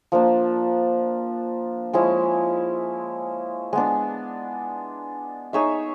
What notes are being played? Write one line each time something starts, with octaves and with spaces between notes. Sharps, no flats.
F3 A#3 D4
F3 G#3 C#4 E4
G#3 B3 D4
D#4 G#4 C#5 E5